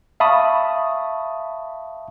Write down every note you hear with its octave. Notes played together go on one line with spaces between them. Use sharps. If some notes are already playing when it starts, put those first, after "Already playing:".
E5 F5 A5 B5 C#6 D#6